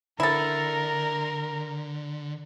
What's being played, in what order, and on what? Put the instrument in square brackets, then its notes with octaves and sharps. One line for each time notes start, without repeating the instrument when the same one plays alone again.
[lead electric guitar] D3 [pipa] E4 A4 [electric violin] A#4